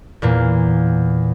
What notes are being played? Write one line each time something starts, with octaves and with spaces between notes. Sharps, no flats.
E2 A#2 A#3